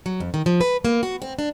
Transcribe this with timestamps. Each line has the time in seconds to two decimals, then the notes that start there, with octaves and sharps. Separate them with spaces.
0.06 F#3
0.20 F2
0.34 D#3
0.46 F3
0.61 B4
0.85 A#3
1.03 F#4
1.22 C4
1.39 D4